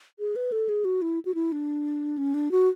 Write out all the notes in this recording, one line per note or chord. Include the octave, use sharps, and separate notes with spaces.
G#4
B4
A4
G#4
F#4
E4
F#4
E4
D4
C#4
D4
F#4